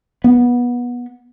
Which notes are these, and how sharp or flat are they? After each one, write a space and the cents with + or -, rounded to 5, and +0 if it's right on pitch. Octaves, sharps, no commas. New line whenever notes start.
B3 -20